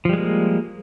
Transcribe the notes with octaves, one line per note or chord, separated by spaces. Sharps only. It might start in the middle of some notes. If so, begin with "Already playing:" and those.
F3 G3 G#3 A#3